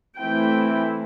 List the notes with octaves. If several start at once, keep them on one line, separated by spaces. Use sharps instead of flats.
E3 A3 C4 E4 G5